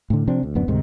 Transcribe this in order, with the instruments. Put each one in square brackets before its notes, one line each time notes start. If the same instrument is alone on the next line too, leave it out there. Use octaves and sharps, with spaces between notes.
[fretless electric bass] A2 D3
C3 F3 C4 D4
D2
D1 F#2 B3 D4
D2 G#2 C3 D#3